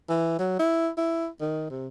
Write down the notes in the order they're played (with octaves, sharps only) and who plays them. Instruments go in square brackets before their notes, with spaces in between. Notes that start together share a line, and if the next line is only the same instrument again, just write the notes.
[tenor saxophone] E3
F#3
E4
E4
D#3
C3